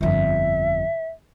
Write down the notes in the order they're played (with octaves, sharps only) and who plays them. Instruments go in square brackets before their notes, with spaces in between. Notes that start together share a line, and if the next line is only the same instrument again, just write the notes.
[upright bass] G1 F2 [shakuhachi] E5